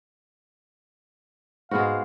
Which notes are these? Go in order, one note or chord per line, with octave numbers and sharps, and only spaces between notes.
G#2 G#3 B3 F#4 F5